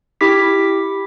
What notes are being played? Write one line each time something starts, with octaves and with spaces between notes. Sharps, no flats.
E4 G4 D6 B6